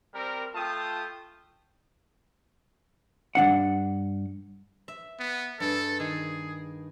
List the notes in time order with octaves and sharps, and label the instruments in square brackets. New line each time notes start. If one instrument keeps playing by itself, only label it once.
[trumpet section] G3 C4 A#4
A3 F4 G5 A5 D#6
[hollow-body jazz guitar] G2 C#3 D4 F#5
[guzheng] E5
[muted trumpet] B3
[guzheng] G2 G#4 [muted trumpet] A4
[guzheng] D#3 [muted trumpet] G#4